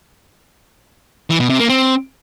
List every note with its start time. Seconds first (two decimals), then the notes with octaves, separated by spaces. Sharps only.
1.30 E3
1.40 B2
1.50 C3
1.60 A#3
1.69 C4